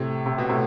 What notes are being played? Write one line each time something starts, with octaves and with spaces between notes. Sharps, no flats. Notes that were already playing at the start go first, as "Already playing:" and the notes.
Already playing: A2 C3
C3
B2
A2 C3